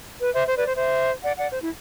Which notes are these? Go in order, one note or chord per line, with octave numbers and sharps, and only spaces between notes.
B4
C5 E5
C5
B4 D5
C5
C5 E5
D5 F#5
D5 F#5
C5
E4